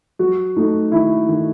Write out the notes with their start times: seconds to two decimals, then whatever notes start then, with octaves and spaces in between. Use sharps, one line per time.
0.19 F#3 F#4
0.56 A3 D#4
0.92 D#3 E4
1.28 D#3